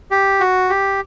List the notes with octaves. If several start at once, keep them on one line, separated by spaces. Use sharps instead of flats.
G4
F#4
G4